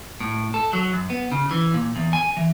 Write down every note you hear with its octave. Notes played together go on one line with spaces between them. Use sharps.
A2
A4
F#3
F#2
B3
C#3
E3
A#2
E2
G#5
E3